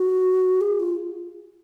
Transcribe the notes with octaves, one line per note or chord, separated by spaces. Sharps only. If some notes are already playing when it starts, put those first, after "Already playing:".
Already playing: F#4
G#4
F4